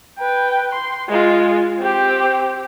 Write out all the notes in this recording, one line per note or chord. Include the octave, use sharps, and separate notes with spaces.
B4 G5
C6
G#3 F4
C4 G4